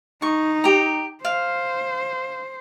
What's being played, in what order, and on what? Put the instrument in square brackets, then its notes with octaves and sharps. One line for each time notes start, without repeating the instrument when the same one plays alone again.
[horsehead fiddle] D#4 [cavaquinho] C#6
[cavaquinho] G4 A#5
[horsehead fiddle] C5 [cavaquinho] F5